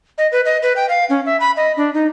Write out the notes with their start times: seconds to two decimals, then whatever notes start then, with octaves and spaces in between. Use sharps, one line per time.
0.18 D#5
0.32 B4
0.45 D#5
0.63 B4
0.76 G5
0.89 F5
1.10 C#4
1.26 E5
1.40 B5
1.57 D#5
1.77 D4
1.94 D#4